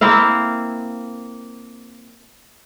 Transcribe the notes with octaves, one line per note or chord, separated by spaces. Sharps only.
A#3 C4 E4 F5